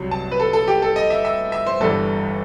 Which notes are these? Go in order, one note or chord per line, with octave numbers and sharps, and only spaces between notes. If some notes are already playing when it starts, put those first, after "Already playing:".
Already playing: C2 C3 F#3
A5
B4
A4
A4
G4
A4
D#5
E5
E5
E5
C5
G1 G2 E3 A4